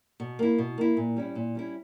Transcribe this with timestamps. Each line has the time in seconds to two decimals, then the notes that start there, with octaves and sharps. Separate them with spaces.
0.20 B2
0.39 A#3 E4
0.58 B2
0.78 A#3 E4
0.97 A#2
1.16 G3 C#4 E4
1.35 A#2
1.55 G3 C#4 E4